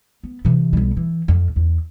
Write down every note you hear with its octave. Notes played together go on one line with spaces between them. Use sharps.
B3
C3 E3
B1 G3
E3
F2
E2